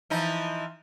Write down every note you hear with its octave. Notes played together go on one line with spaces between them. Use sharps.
E3 F3 D#4